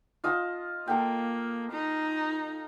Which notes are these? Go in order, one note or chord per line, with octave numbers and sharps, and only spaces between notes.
F4 D#5 A5
A#3 A4 G5
D#4